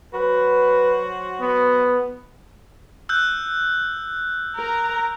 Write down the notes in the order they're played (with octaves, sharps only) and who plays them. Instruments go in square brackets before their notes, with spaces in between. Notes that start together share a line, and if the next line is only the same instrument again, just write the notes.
[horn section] F#3 F#4 C5 [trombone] B4
[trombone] B3
[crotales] E6 F#6 G6
[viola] A#4 A#5